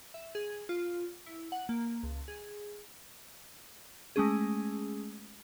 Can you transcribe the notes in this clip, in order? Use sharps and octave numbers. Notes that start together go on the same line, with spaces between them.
E5
G#4
F4
E4
F#5
A#3
C#2
G#4
G#3 A3 C#4 G#4